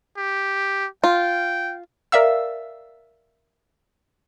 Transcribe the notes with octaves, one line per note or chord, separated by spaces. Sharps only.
G4
F4 G5
A#4 D5 E5 F5 E6